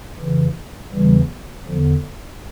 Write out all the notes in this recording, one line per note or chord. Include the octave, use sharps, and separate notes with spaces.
F2 C#3 E3
E2 C#3 E3 G3
E2 D3 F3